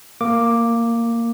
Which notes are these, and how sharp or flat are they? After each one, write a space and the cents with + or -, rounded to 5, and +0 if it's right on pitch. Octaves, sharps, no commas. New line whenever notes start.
A#3 -10 D6 +0